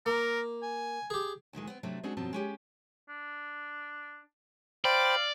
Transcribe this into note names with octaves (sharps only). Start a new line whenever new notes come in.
A#3 A#4
G#5
G4 G#4
D2 A#2 D#3 G#3
B3 C4
C3 F#3 A3 C4 D4
G#3 C4 D4 F#4 G#4 A4
F#2 B2 F3 F#3 C4 A5
G#3 C#4 G4
D4
C5 D5 F5 G5 B5